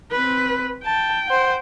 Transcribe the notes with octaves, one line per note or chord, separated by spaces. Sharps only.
C4 B4
G5 A5
C5 F#5